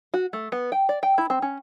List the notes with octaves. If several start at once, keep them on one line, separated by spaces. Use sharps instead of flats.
F#4
A3
B3
G5
D5
G5
E4
C4
C#4